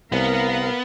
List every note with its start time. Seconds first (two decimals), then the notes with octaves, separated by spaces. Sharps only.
0.12 C2 B3 A#4 F5